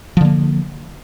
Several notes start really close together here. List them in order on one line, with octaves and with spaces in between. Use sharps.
F3 D3 A#3